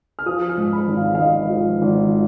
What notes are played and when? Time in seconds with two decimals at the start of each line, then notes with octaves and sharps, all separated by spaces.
0.19 F6
0.26 F3 D#6
0.50 F6
0.57 G#2
0.73 B5
0.88 G#1
0.97 F5
1.15 F5
1.19 G#1 D#5
1.50 F3
1.81 G#1